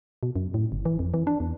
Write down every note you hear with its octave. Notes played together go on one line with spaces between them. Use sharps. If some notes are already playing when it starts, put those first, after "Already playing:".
B2
F#2
A2
G1
E3
F2
E3
D4
E2